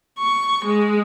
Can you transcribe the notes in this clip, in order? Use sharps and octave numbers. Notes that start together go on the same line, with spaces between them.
C#6
G#3